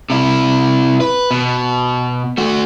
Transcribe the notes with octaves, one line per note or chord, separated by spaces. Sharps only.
C3 E4
B4
B2
A3 F#4